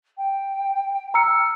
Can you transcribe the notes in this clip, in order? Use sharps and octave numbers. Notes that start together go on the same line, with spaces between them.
G5
A#5 E6 F6 C#7